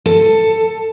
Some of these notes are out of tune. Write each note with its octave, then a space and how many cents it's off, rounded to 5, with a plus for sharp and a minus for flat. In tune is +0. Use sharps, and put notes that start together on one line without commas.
A4 +15